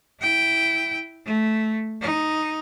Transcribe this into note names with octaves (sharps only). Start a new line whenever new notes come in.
E4 G5
A3
D#4